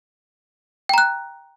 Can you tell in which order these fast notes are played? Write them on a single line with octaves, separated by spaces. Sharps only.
G5 A#5 F#6